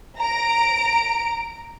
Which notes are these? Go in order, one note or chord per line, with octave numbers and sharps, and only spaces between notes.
A#5 D7